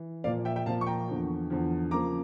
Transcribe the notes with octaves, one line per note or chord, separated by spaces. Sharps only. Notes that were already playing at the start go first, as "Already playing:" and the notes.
Already playing: E3
A#2 F3 A#3 D5 F5
E5 G5
E5 G5
A#2 F3 A#3 F5 A5
C#6
G5 A#5
E2 D3 F3
E2 D3 F3
C#3 F3 A#3 A#5 D6